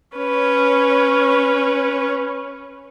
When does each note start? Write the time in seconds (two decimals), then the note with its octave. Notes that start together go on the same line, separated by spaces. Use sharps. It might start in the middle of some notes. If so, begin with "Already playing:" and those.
0.16 C#4 B4 C#5